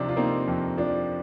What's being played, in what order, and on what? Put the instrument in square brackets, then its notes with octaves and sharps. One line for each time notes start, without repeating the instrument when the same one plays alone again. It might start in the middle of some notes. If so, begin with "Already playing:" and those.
Already playing: [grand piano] C3 F3 C4 D4 D#4
F4
A#3 C4 D#4
F2
F3 D4